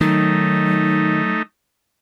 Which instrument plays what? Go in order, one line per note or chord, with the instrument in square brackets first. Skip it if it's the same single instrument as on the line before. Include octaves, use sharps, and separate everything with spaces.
[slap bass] D#3 [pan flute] F#3 [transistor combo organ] A3 D#4